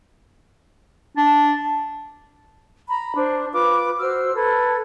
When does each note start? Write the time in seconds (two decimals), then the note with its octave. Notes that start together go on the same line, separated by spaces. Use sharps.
1.17 D4
2.89 A#5 B5
3.16 D4 C5
3.53 F4 B4 D6
4.00 F#4 C5 E6 F6
4.36 A4 B4 G#6